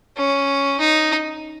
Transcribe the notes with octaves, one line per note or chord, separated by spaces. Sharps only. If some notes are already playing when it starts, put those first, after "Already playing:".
C#4
D#4